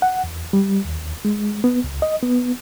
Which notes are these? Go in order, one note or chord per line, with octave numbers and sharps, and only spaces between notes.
F#5
E2
G3
D#2
G#3
B3
C#2
D#5
B3